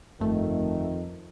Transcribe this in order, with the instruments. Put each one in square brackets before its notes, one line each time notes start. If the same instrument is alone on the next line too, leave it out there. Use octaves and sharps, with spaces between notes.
[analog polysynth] G1 A3 [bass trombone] F2 [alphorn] D#3